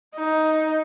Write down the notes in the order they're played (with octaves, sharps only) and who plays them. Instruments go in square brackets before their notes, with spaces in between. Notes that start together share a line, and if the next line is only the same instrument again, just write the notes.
[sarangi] D#4